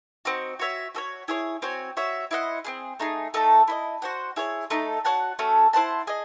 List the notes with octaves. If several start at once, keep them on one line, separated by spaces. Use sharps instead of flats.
C4 D#4 F#4
F#4 C#5 E5
F#4 A4 C#5
E4 G#4 C#5
C4 F#4 C#5 G#5
F#4 C#5 E5
E4 C5 D#5 F#5
C4 D#4 G#4
A3 D#4 G#4
A3 D#4 A4
E4 C5 D#5
F#4 C5 F#5
E4 G#4 C#5
A3 D#4 A4
F#4 C#5 F#5 A5
A3 C#4 F#4 A4
E4 C5 F#5 A5
G#4 D#5